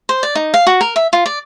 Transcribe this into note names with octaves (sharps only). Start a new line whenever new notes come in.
C5
D5
D#4
F5
F#4
A#4
E5
F4
D5